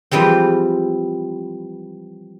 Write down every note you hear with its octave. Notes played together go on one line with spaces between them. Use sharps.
E3 F3 G3 G#3 C4